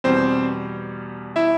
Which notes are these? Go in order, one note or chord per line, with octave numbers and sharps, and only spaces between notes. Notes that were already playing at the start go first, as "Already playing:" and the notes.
E2 B2 G3 C4 C5
E4 E5